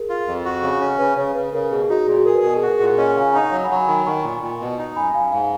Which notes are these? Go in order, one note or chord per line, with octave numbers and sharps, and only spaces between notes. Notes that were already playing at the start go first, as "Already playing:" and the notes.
Already playing: G#4 A#4
F4
F2
F#4
C#3
C#4
C#3 B4
C#3 C#5
C#3 B4
C#3 A#4
B2 G#4
D#4 F#4
A#2 G#4
F#4
G#4 A#4
B4
B2 A#4
G#4
F#4
A#4
A#2 G#4
C#4 D#5 F#5
C#3 F5 G#5
D#4 F#5 A#5
F#3 F#5 A#5
G#5 B5
F#3
G#5 B5
D#3 G#5 B5
D#3 A#5 C#6
A#2
A#2
B2
D#4
F#2 G#5 B5
F#2 F5 G#5
G#2 F5 G#5